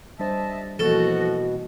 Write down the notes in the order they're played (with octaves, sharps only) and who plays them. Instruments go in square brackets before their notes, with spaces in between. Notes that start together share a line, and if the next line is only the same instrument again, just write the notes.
[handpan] G3 D4 C5 [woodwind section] D#5 E5 A5
[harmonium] B2 [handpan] E3 A#3 B3 [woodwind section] F3 F#4 [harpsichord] A4